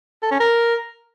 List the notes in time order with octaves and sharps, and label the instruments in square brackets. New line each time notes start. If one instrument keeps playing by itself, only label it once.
[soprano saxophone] A4
C#4
A#4